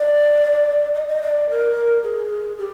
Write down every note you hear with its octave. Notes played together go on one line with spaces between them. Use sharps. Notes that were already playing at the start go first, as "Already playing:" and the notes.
Already playing: D5
D#5
D#5
D5
A#4
G#4
G4